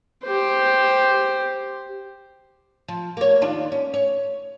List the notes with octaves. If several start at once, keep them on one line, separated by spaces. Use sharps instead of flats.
G4 C5
F3
A#3 C#5
D#2 D4 F4
C#4
C#5